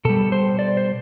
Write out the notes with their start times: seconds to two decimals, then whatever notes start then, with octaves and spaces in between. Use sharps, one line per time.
0.05 B2 G3 A4
0.32 C5
0.59 D5
0.77 C5